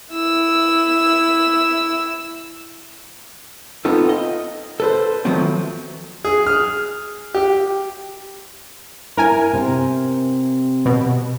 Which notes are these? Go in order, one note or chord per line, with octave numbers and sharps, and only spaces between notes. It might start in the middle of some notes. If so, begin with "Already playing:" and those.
E4 E6
B3 C4 D#4 F4 A4
D#5
A4 B4 C5
D#3 F3 F#3 A3 B3 C4
G#4
F6
G4
E4 A#4 G#5
C3
B2